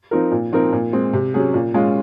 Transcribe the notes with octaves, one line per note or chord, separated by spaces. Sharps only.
F3 C4 D#4 A#4
A#2
F3 C4 D#4 A#4
A#2
G#3 C4
C3
F#3 C#4 G#4
A#2
G#3 C#4 F4